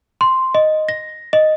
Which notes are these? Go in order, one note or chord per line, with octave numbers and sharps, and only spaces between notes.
C6
D#5
A#6
D#5